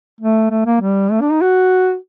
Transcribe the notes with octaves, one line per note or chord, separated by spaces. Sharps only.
A3
A3
A#3
G3
A3
D4
D#4
F#4